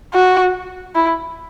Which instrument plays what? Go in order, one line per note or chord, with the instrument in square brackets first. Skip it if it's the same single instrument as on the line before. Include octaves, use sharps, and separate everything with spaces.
[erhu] F#4
E4